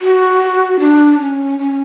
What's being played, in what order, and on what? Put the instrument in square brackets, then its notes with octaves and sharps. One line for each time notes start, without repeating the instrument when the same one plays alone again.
[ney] F#4
D4
C#4
C#4